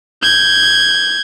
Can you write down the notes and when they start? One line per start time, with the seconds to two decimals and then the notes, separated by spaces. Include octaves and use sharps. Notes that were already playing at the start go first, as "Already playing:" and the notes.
0.22 G6 G#6